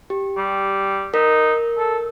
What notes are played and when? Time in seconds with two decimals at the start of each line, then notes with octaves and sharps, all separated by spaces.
0.10 G4
0.37 G3
1.14 D#4 A#4
1.78 A4